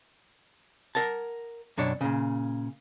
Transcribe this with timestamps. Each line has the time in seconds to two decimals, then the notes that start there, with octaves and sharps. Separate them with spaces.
0.95 A#4 F#5 A5
1.78 F#2 B2 D4 C#5
2.01 A#2 C#3